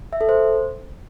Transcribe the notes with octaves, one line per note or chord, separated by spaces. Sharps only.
E5
A4
C5